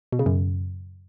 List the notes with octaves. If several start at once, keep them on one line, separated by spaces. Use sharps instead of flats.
B2
C#3
F#2